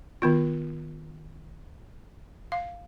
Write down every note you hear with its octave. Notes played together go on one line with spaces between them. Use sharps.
D#3 B3 F4
F5